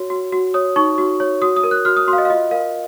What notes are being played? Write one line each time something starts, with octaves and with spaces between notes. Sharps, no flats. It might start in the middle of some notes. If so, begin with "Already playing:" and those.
Already playing: F#4 C#5
F#4
F#4
C#5 D#6
D#4 C#6
F#4
C#5
F#4 D#6
D#6
A#4
F#6
F#4 F6
D#6
F#4 C6
F5
D#5
F5
F4 D#5
A#4 F5